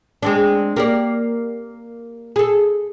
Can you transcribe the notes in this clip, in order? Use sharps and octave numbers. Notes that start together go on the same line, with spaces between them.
G#3 C4 D4
A#3 G4 D5
G#4 A4